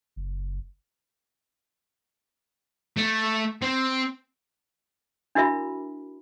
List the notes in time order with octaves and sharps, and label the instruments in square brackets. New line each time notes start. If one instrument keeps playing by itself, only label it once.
[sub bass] F#1
[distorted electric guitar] A3
C4
[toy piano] D4 E4 F#4 A#4 E5 B5